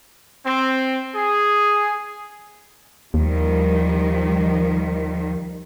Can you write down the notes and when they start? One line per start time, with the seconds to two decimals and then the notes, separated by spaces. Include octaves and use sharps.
0.45 C4
1.15 G#4
3.14 D#2 D#3 F3 G3